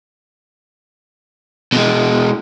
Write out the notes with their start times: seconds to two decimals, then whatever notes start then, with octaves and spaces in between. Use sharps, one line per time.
1.73 B2 G#3